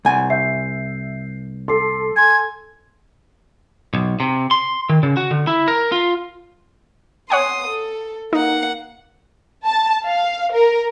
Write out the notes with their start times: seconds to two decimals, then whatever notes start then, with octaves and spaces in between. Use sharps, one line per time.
0.05 C2 F#5 G#5
0.30 E5 G6 C7
1.68 A4 C6 D6 C7
2.16 G#5 C6 G#6
3.94 B1
4.20 C3
4.51 C6
4.89 D#3
5.03 C#3
5.17 F#4
5.31 D3
5.47 E4
5.68 A#4
5.92 F4
7.30 C#5 F#5 G#5 C6 D#6
7.67 A4
8.33 A#3 D#4 F#5
9.65 A5
10.04 F5
10.53 A#4